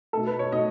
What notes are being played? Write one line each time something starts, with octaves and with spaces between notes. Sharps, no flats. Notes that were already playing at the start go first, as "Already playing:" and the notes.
B2 A3 A4
B4
C#5
B2 A3 D#5